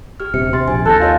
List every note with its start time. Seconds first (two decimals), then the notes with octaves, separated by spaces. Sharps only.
0.20 G4 F6
0.34 D#1 C3 D4 C#7
0.53 C3 C6 A6
0.68 A#1 G#5
0.86 D#2 A4 F#6 G6 A#6
1.00 F4 C#5 D#5 A#6